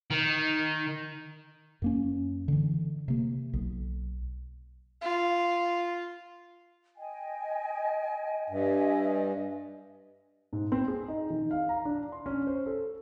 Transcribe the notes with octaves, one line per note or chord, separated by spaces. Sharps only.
D#3
F#2 A#3 C#4
D3 E3
C3 A#3
B1
F4
D#5 G5 G#5
G2 D#5 E5 G#5
G#2
C4
G#4
D#4
D#3
F5
A#5
D4
C6
C#4
C5
A4